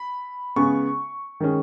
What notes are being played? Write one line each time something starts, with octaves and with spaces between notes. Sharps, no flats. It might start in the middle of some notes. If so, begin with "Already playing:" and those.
Already playing: B5
C#3 G#3 B3 C#6
D#3 G#3 C#4